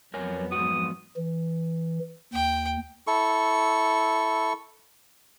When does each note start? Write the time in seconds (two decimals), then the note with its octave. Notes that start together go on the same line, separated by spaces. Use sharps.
0.14 F2 F#3 B3 A#4 C#5 G#5
0.52 G#2 F#4 D#6
1.17 E3
2.33 D#2 G5
3.07 E4 A4 C#6